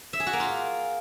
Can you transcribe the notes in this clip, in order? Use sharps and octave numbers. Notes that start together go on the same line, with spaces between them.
E5
G#4
F#4
A#3
F4